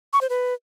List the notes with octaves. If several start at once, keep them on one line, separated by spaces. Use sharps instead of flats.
C#6
C5
B4